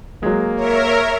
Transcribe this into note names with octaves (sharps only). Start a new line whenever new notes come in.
F#3 G#3 A#3
A#4 C#5 E5